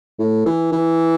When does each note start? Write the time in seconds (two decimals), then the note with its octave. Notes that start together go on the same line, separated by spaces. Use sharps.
0.19 A2
0.46 E3
0.72 E3